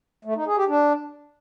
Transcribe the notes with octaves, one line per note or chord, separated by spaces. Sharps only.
A3
D#4
G#4
G4
D4